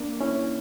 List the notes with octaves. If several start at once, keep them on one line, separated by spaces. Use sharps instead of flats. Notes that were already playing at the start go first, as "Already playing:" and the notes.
Already playing: A#3 D4
C#4 E4